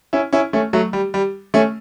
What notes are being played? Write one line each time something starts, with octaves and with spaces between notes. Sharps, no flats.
C#4 E4
C#4 E4
A3 C#4
F#3 A3
G3
G3
A3 C#4